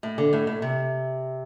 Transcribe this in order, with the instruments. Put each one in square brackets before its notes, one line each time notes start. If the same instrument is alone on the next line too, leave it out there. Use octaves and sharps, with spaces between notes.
[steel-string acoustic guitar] A2
D3
A2
A2
C3